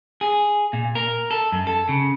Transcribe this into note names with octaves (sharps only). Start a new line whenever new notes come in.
G#4
A#2
A#4
A4
F#2
A4
C#3